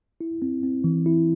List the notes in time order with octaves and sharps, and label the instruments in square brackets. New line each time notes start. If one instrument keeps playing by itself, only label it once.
[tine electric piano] E4
C4
C4
E3
E4